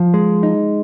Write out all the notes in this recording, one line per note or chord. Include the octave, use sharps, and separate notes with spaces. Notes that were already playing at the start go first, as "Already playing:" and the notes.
Already playing: F3
G#3
D#4